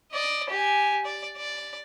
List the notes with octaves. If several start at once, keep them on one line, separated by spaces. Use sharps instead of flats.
D5 D#5
G4 G#5
D5
D5